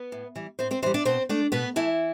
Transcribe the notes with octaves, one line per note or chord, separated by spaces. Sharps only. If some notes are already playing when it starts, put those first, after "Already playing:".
Already playing: B3 B4
A2
E3 G3
A2 C4 C5
C4 C5
E3 G3 C4 C5
D4 D5
B2 C4 C5
A3 D4 D5
B2 B3 B4
E3 A3 E4